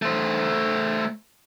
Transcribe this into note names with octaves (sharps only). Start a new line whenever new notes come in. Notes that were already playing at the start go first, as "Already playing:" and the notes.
A3 C5